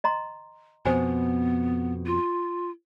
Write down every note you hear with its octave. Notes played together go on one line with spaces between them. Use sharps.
D#5 A#5 C6
F2 B2 B3 C5 G#5
F4